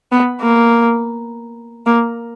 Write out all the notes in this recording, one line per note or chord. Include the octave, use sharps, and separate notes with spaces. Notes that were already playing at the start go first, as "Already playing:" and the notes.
B3
A#3
A#3